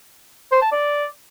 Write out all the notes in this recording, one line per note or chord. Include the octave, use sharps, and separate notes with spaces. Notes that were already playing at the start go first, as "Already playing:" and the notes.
C5
A5
D5